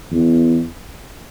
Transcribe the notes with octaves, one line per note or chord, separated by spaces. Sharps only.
E2